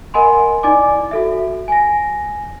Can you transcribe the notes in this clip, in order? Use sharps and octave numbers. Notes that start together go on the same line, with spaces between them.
A#4 D#5 F#5 G#5 B5 C6
D#4 E4 D5 G#5 D6
F#4 A4 E5
G#5 A#6